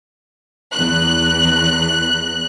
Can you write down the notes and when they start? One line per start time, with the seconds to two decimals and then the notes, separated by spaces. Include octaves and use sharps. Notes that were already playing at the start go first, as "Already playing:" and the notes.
0.71 E2 F#6